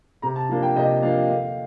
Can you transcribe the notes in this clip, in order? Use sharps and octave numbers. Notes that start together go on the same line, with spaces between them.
C3 A#5
A5
F3 A#3 D4
G5
C3 D#5
F3 A#3 D4 F5
D3